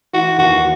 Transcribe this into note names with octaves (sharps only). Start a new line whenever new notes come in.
E3 F#4
D#2 F#4